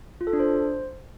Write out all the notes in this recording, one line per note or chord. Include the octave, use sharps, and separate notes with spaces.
F4
A4
D4
C5